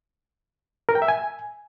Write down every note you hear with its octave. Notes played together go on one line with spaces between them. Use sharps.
A#4
G5
E5
G#5